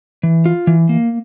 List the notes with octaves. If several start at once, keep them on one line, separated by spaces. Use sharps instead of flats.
E3
F4
E3
A#3